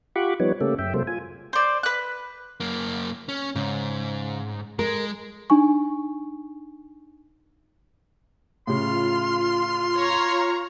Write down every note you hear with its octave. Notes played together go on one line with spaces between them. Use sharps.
F4 G4 F#5 B5 C#6 D6
F3 G3 B3 D#4 B4 C#5
C#3 A3 A#3 C#4 G4 A4
F#2 E5 G5
C3 F#3 G#3 A#3 A4 C5
F4 G#5
C5 D5
B4 F#6
F#2 A#3
C#4
G#2 C#3
G#3 A#4
D4 D#4 G#5 C#6
A2 C#3 F4 C6 F6
C#5 A#5